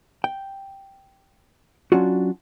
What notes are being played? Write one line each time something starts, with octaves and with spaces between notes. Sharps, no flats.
G5
F#3 C#4 D4 F4 F#4